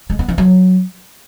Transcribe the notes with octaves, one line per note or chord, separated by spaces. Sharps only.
G#3
B3
E3
F#3